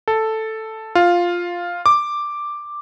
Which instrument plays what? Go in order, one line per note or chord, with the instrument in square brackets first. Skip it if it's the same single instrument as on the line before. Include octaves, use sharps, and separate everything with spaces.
[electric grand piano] A4
F4
D6